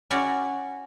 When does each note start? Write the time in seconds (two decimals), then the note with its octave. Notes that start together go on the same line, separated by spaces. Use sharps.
0.11 C#4 E4 F#4 D5